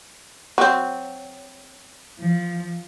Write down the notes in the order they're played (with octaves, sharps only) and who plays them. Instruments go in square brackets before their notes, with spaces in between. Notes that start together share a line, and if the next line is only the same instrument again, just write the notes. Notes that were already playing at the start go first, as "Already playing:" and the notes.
[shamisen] F#3 C4
[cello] F3